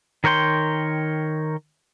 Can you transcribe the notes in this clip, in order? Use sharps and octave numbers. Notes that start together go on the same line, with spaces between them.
D#3 A#4 C#5 G5 C6